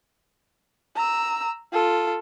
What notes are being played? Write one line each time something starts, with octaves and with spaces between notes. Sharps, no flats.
A#5 E6
F4 A4